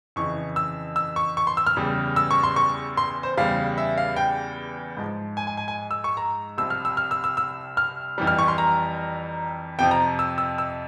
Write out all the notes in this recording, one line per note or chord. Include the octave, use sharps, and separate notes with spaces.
F2 C#3 E3 C#6
E6
E6
C#6
C#6
C6
E6
F6
E2 C#3 G3
E6
C#6
C6
C#6
C6
C5
E2 C#3 G3 F5
E5
F5
G5
G#2 F3
G#5
G#5
G#5
G#5
E6
C#6
A#5
C2 C3 F3 E6
F6
E6
F6
E6
E6
E6
F6
F2 E3 G3
F6
C#6
C6
A#5
F2 C3 F3 G5
A#5
E6
E6
E6